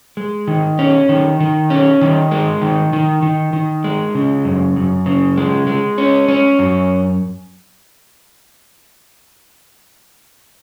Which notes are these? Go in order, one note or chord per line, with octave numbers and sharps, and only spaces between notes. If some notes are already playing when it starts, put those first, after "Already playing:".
G#3
D#3
C#4
D#3
D#3
C#4
D#3
G#3
D#3
D#3
D#3
D#3
G#3
C#3
F#2
F#2
C#3
G#3
G#3
C#4
C#4
F#2